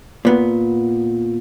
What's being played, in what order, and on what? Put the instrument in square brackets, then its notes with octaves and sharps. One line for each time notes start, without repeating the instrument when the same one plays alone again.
[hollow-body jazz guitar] A#2 B3